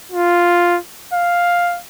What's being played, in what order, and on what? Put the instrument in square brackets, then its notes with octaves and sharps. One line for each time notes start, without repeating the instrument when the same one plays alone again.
[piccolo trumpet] F4
F5